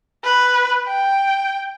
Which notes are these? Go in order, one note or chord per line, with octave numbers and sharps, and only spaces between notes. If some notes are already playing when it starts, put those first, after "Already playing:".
B4
G5